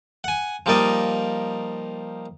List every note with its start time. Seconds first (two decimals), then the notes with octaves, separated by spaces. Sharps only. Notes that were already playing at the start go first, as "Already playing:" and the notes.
0.24 F#5 G#5
0.66 F3 G3 A#3 D#4 D5 D#5